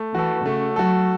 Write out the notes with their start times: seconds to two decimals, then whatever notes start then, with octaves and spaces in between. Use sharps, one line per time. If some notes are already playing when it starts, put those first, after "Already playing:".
Already playing: A3
0.14 E3 F#4 A4
0.45 C#3 A3
0.76 F#3 F#4 A4